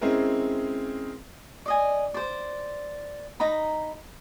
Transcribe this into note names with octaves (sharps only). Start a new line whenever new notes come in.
G#3 C4 C#4 E4 G#4 A#4
D5 D#5 G#5
C5 D5
D#4 A#5 B5